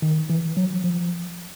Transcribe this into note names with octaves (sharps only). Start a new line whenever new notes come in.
D#3
E3
F#3
F3